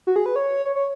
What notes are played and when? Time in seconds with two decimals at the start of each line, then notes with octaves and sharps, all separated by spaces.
0.07 F#4
0.16 G#4
0.26 B4
0.36 C#5
0.65 C#5
0.76 C#5